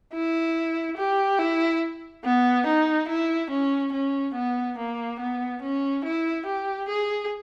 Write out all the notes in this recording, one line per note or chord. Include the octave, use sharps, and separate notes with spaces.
E4
G4
E4
B3
D#4
E4
C#4
C#4
B3
A#3
B3
C#4
E4
G4
G#4